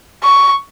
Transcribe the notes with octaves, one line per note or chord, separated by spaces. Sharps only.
C#6